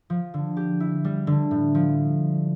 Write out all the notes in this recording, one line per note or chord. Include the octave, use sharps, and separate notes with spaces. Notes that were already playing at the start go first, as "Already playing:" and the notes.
F3
D3
G4
E4
G3
D3
A2
F3